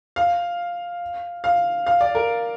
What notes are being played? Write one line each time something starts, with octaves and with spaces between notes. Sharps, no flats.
F5
F5
F5
D5
A#4